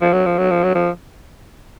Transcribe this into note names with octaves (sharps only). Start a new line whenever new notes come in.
F3
F#3
F3
F#3
F3
F#3
F3